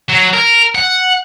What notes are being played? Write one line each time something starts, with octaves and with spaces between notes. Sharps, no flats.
F#3
A#4
F#5